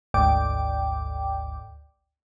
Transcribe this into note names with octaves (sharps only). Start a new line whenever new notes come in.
G#1 D2 G#2 D5 G5 D6